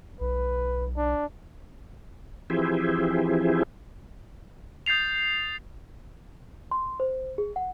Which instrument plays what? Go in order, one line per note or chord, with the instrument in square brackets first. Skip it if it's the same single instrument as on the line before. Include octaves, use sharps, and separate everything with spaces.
[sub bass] B1 [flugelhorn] B4
[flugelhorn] D4
[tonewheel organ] E3 F3 C4 E4 G4 G#4
[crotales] D#6 G6 A6 C7 F7
[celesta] C6
C5
G#4
F#5